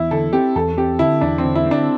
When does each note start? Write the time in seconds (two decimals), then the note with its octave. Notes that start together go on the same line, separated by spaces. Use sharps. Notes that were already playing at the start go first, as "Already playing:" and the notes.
Already playing: E2 E4
0.11 D3 A4
0.33 C4 G4
0.55 E2 A4
0.77 C4 G4
0.99 D3 E4
1.21 E2 D4
1.38 C4
1.44 D3
1.55 E4
1.66 C4 D4